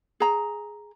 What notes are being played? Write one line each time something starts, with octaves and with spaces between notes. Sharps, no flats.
G#4 A#5